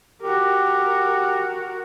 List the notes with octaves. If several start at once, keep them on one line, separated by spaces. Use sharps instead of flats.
F#4 G4 A#4